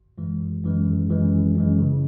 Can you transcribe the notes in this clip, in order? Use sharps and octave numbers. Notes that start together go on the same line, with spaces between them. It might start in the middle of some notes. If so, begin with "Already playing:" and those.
Already playing: G#1
F#2 E3 G#3
G#1
F#2 E3 G#3
G#1
F#2 E3 G#3
G#1
F#2 E3 G#3
C#3